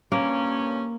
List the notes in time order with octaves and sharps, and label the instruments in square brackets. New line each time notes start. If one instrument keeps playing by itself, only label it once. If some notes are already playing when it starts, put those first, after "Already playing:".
[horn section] G2 A#2 C#4 [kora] A#3